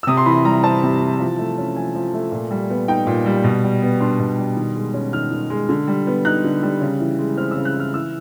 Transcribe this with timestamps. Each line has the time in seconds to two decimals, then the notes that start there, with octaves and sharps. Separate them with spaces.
0.03 E6
0.07 C3 D#6
0.17 C6
0.26 E3 B5
0.45 G3 A#5
0.63 C4 A5
0.83 C3
1.01 E3
1.20 F3
1.38 A3
1.58 C#4
1.76 F3 G#5
1.95 F3
2.14 A3
2.32 A#2
2.51 G3
2.70 B3
2.88 D#4 G5
3.07 A#2
3.26 G3
3.44 B2
3.64 G3
3.82 B3
4.00 D4 C6
4.20 B2
4.38 G3
4.56 D#3
4.75 G#3
4.93 C#4
5.13 D#3 F6
5.31 D#3
5.50 G#3
5.69 D3
5.88 G3
6.07 B3
6.25 D#4 F#6
6.44 D3
6.63 G3
6.81 C#3
7.00 E3
7.19 G#3
7.37 C4 F6
7.51 C#3 E6
7.65 F#6
7.75 E3 F6
7.94 E3 E6